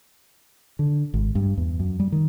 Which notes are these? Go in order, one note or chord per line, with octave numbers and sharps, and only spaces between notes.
D3
G#1
G2
E2
F#2
G3
D#3